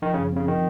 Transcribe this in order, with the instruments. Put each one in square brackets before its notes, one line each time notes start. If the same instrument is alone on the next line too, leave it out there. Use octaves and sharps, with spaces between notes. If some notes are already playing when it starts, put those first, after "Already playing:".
[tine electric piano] D#3 [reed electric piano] F3
[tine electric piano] C#3
[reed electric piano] F#2
[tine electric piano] C#3 [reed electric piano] C4
[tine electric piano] D#3 [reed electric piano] F3